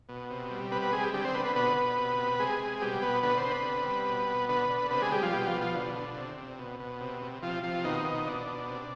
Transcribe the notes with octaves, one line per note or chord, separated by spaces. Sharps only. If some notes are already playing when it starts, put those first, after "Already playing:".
B2
C3
G3
C3 B3 B4
B3 B4
C3 G#3 G#4
G3 G4
D3 G3 G4
C4 C5
D3 B3 B4
B3 B4
B2 B3 B4
B2
C3
C3
C3 G#3 G#4
C3
B2 G3 G4
B2 B3 B4
D3 B3 B4
C4 C5
D3
B3 B4
C3
G3
B2
B2
D3 B3 B4
D3
C3 B3 B4
G#3 G#4
G3 G4
F3 F4
B2 G3 G4
F3 F4
B2
F3 F4
D3
D3
C3
C3
B2
B2
C3
C3
C3 F3 F4
C3 F3 F4
B2 D#3 D#4
B2
B2 D4
B2
C3